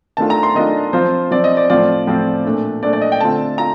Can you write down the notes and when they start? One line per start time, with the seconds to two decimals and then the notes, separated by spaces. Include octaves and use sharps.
0.17 D#3 A3 D4 F4 A5
0.30 A#5
0.43 C6
0.55 D#3 A3 D4 F4 D#5
0.93 F3 C4 F4 C5
1.31 F3 C4 F4 D5
1.44 D#5
1.57 D5
1.70 A2 F3 C4 F4 D5
2.07 A2 F3 C4 F4
2.45 A#2 A3 D4
2.83 A#2 A3 D4 D5
2.93 D5
3.01 D#5
3.12 G5
3.21 D3 A3 C4 F4 A5
3.58 F4 A#5